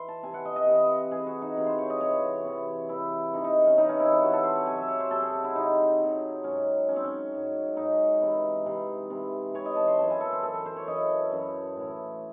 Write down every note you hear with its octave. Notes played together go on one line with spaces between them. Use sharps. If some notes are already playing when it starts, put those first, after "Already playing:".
Already playing: E3 C6
A5
C3 E3 G#5
F#5
D#5
D#5
C3 E3
C3 E3 G#4
F#4
D#4
C3 E3
C5
C#5
D#5
C3 E3 C#5
C3 E3
C3 E3 E4
C3 E3 D#4
D#4
C#4
C3 E3 D#4
C#4
E4
F#4
C3 E3 F#4
A4
C5
C#5
C3 F#3 G#5
E5
C#5
C5
C3 F#3 A4
G#4
F#4
E4
C3 F#3 D#4
C3 F#3
G#2 F#3 C#4
G#2 F#3 C#4
C4
C#4
G#2 F#3
G#2 F#3 D#4
C3 E3
C3 E3
C3 E3
C3 E3 C#5
D#5
A5
C6
F#2 E3 A5
G#5
A4
C5
F#2 E3 A4
A4
C5
C#5
F#2 E3 D#5
F#2 E3
A2 E3